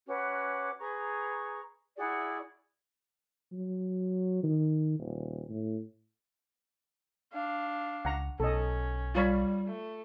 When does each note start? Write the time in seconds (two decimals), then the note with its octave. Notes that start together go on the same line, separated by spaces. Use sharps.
0.06 C#4 F#4 B4 D6
0.78 G#4 B4 A#5 C#6
1.96 E4 F#4 G#4 D5
3.53 F#3
4.43 D#3
4.99 D#1
5.49 A2
7.33 D4 F5
8.05 C#2 F#5 A#5
8.40 B1 C#4 A4 D#5
9.15 G3 F4 C#5 B5
9.67 A3